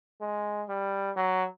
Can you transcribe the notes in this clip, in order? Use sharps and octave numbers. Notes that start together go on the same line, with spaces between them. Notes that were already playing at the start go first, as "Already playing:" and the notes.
G#3
G3
F#3